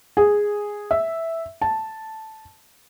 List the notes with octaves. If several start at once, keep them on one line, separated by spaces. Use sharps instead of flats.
G#4
E5
A5